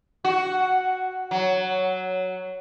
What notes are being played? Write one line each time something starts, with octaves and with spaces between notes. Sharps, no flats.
F#4
F#3